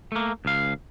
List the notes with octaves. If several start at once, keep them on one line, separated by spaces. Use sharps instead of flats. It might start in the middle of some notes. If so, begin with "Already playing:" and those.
A3 A#3
C#2 F5